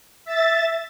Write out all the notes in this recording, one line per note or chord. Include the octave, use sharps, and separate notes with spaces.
E5 A6